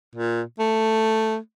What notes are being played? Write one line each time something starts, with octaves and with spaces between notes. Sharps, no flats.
A#2
A3